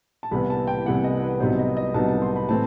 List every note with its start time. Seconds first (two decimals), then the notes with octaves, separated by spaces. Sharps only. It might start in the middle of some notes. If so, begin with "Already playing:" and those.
0.23 A5
0.31 C2 C3 E3 B3 B5
0.50 A5
0.67 G5
0.86 C2 C3 E3 B3 F#5
1.04 D#5
1.22 B4
1.40 C2 C3 F#3 B3 D#4 C5
1.59 D#5
1.77 D#5
1.94 C2 C3 F#3 B3 D#4 A5
2.08 A5
2.22 C6
2.36 B5
2.48 A2 E3 A3 C4 A5